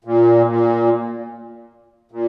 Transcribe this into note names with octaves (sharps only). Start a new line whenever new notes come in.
A#2
A#2
A#2